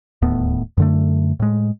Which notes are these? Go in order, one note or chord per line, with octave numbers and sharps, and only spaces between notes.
D1 D#2 A2 B3
F#2 D3 A3
A2 G#3